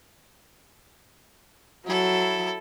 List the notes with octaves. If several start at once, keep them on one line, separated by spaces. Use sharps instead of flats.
F#3 E4 A4